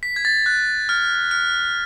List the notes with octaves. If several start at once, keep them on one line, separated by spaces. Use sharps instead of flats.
B6
G#6
A6
F#6
F6
F6